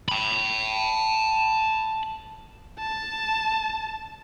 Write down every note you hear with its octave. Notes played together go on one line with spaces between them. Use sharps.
A5 B5
A5